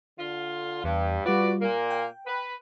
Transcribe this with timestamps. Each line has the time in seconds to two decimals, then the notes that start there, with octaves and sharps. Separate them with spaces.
0.19 D3 F4
0.84 E2 G2
1.26 G3 F4 F#4 B4 D5
1.61 A#2 A#3
1.90 G5
2.27 B4